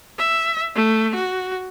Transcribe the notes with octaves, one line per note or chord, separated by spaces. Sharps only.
E5
A3
F#4